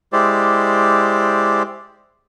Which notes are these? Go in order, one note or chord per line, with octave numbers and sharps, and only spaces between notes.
G#3 E4 G4 C5 D5